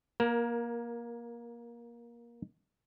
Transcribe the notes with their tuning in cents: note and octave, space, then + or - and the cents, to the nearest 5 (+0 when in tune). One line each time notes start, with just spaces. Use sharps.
A#3 +20 A#4 +0